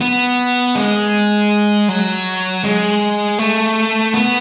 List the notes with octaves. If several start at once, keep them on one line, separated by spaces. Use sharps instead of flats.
B3
G#3
F#3
G#3
A3
B3